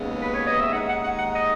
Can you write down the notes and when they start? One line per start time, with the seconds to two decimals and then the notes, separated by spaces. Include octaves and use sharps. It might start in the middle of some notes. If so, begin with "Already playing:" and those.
Already playing: D#2 C#3 G#3 B3
0.22 B4
0.34 C#5
0.47 D#5
0.60 E5
0.72 D#2 D#3 G#3 D#4 F#5
0.89 F#5
1.03 F#5
1.18 F#5
1.35 D#5